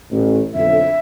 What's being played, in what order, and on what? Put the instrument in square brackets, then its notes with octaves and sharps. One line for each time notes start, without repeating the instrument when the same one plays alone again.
[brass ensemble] A1
[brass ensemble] B1 F2 D3 [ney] E5